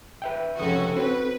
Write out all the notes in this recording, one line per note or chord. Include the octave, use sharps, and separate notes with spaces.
B4 E5 G5
F1 C#2 C#4 F#4 A4 D#6
C4 F#4 B4